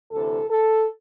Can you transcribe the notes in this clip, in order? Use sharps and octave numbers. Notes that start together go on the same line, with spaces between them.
D2 C3 E3 A4
A4